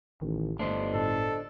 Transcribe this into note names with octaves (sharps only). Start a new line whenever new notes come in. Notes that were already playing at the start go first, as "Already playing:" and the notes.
A1 D#3
G1 A3 D4 C5 D#5
A2 A4